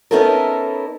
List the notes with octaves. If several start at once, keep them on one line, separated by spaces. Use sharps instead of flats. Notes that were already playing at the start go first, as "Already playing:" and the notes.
B3 C#4 D#4 E4 A4 A#4